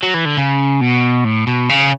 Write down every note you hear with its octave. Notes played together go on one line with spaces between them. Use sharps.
F#3
E3
D3
C#3
B2
A2
B2
C#3